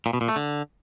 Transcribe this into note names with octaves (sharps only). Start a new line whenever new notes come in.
A#2
B2
A#2
A3
D3